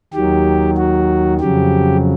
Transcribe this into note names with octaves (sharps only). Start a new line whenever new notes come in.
D#2 D#3 F#3 G4
F#4
F2 C#3 F#3 G4